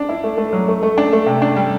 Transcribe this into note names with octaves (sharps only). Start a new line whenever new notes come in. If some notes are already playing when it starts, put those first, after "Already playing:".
Already playing: D4
E4
A3
A3
F#3
A3
A3
D4
A3
C3
D4
G3